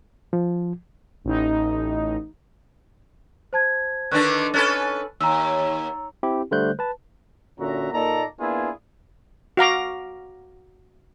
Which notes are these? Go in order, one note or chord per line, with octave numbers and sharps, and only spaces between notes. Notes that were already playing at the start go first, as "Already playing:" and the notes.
F3
A1 D#4
C5 A5 G#6
D3 D#3 D4 B4 C#6 F#6
C#4 A4 B4 F#6 A6
D#2 A#5 E6
C4 E4 G4
D3 G3 A3 C5 F#6 G6
B4 A5
A#2 D3 C#4 F#4 E5 A#5
A#2 A#3 D#4 A4 D5 A#5
A#3 B3 D4 E4 F4 G#4
F#4 F5 A#5 D6